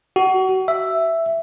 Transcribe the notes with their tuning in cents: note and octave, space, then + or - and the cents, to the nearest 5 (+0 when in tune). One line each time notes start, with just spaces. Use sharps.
F#4 +30
E5 +5